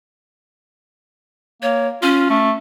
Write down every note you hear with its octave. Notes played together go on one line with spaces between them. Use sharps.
A#3 C#5
C#4 F4
A3